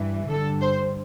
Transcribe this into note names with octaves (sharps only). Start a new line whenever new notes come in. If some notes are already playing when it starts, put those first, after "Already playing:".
Already playing: G2 E3
G2 D3 A4
C5